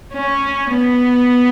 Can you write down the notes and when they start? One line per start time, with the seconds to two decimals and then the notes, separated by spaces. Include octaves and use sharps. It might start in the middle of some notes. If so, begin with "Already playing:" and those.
0.14 C#4
0.70 B3